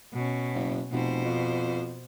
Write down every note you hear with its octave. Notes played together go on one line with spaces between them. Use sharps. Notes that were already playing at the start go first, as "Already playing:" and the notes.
B2 C#4
F#1
F1 B2 C5
F2